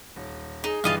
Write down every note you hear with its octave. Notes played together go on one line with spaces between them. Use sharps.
D#1
D#4 G#4
G2 E3 F4 G4 D#5 F5